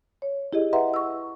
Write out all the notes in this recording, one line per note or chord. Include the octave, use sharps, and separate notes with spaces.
C#5
E4 G4 G#4 D#5
B4 D#5 E5 F#5 A#5 C6
C#6 E6